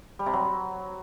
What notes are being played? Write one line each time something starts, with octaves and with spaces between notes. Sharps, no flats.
G3
C3
F#3